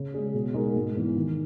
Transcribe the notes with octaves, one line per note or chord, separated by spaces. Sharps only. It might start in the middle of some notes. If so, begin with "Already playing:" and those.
Already playing: C#3
G#3 C#4 G#4
B2
G#3 D#4 F#4 A#4
G#2
E3 B3 E4
D#3